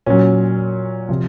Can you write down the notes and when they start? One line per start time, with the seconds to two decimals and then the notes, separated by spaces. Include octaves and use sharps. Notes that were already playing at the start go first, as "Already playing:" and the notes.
0.06 A#2 F#3 C#4
1.09 C3 F3